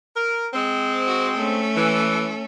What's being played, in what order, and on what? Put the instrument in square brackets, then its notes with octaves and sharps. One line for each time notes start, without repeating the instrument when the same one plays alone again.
[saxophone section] A#4
G#3 C4
[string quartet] F#4
A3 C#4 A4
[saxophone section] E3